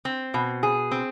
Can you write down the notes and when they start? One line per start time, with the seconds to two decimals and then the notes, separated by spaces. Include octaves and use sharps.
0.05 C4
0.34 B2
0.63 G#4
0.91 C4